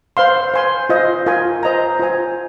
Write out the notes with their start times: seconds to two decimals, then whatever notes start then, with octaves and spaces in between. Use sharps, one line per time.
0.17 C5 F5 C6
0.54 C5 G#5 C6
0.89 F4 C5 D#5
1.26 F4 A#4 G#5
1.63 C5 D#5 A#5
2.00 F4 C5 G#5